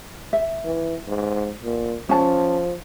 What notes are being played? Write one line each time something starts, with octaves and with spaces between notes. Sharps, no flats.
E5
E3
G#2
A#2
F3 C#4 A5